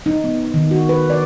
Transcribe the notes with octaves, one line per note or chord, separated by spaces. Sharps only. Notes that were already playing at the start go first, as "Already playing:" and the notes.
D#4
B3
D#3
F#4
B4
D5